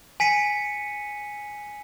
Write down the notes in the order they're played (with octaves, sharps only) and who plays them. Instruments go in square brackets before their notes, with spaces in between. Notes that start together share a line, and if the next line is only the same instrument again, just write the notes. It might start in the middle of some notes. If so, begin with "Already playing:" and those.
[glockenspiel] G#5 B6 C#7 D#7